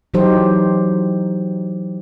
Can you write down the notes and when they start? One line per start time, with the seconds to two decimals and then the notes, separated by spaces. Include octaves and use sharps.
0.14 E3 F#3 D#4 G4 C5